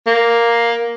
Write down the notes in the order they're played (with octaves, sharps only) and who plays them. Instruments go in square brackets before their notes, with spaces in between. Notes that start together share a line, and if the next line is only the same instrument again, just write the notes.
[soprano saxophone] A#3